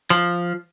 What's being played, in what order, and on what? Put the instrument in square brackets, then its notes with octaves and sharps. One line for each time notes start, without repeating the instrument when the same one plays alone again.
[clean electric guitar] F3